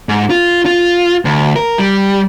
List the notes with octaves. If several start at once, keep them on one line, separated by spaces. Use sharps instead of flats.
G#2
F4
F4
D2
A#4
G3